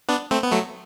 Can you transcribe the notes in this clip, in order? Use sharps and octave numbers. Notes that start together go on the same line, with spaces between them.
B3 D4
A3 C4
B3
F#3 A3